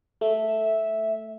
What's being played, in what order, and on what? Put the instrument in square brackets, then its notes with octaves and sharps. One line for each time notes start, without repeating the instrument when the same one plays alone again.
[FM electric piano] A3 [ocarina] E5